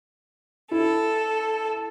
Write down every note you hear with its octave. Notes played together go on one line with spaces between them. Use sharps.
E4 A4